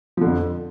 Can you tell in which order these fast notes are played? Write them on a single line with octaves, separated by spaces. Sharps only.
F3 D3 F2